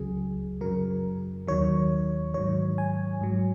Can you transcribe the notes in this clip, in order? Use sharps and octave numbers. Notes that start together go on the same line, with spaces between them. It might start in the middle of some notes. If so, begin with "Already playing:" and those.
Already playing: C#2 C#3 F#3 G#4
F#2 C#3 F#3 A#4
D#2 D#3 F#3 C#5
G#2 D#3 F#3 C#5
G#5
G#2 F#3